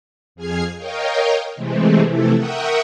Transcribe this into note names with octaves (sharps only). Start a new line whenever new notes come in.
F2 G#4 F6 G#6 C7
A#4 C#5 D#5 F5 G5
C3 E3 G#3 A3 C4
C3 E3 F3 A3 E4 A4
A#4 E5 F#5 G5 C#6 D#6